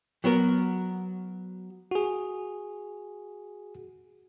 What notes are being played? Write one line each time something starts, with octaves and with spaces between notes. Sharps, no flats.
F#3 B3 F#4 A#4
F#4 G#4